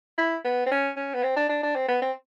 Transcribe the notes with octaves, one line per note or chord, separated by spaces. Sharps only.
E4
B3
C4
C#4
C#4
B3
C4
D4
D4
D4
C4
B3
C4